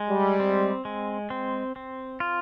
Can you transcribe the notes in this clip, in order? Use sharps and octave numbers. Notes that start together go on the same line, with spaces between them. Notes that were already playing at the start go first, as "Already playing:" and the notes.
Already playing: G#3
G3
C4
G#3
C4
C4
F4